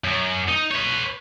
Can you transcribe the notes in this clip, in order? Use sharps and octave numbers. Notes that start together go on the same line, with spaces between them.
F#2
D#4
B4 C#5